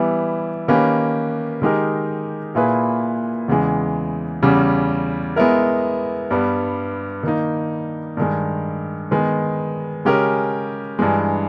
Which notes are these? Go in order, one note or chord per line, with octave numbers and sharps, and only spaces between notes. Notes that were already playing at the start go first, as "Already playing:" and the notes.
Already playing: E3 G3 B3 E4
D#3 A#3 C#4 G4 B4
D#3 G#3 D#4 G4 A#4
A#2 A#3 E4 G#4 B4
E2 C#3 E3 G#3
E2 C#3 G3 C#4
G#3 B3 E4 A#4
G2 G3 B3
D#3 A#3 D#4
G2 D#3 G#3
D#3 G#3 B3
C#3 G#3 C#4 G4 A#4
G2 E3 G#3